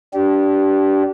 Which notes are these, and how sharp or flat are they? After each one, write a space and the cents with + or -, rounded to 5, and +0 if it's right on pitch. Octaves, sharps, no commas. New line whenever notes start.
D4 -20 G4 -30